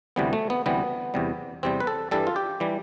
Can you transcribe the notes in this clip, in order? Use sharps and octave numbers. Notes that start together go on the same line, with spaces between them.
D2 C3 E3 G3 B3
A3
B3
D2 C3 E3 G3 B3
E2 C3 G3
E2 C3 G3 C4
B4
A4
G2 E3 G3 A4
F4
G4
E3 G3